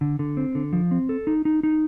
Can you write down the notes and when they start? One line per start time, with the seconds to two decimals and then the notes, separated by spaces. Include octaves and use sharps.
0.01 D3
0.19 D3
0.37 C4
0.55 D3
0.73 F3
0.91 C4
1.09 A4
1.27 D#4
1.45 D#4
1.63 D#4